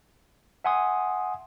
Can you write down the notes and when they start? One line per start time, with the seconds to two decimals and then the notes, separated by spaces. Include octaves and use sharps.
0.64 E5 F#5 G#5 C6 D#6